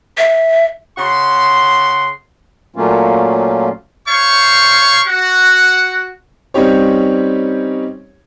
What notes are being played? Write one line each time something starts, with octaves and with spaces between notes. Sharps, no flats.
E5
C#3 F#5 C6
A#2 F#3 A3 A#3 C#4 F4
C5 C#5 F5 C#6
F#4 F#5
G3 C4 C#4 D#4 G4 C#5